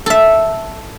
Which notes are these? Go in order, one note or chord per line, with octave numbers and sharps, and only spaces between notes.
A4 E5